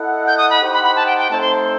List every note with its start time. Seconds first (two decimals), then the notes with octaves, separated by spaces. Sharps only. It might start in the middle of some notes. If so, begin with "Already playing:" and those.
Already playing: E4 A4 D#5 F#5
0.27 G6
0.38 D#6
0.50 B5
0.62 D#4 G4 C5 F#5
0.73 B5
0.84 B5
0.96 A5
1.07 G5
1.18 G5
1.30 A3 C4 D#4 A4 C5 A5
1.41 C6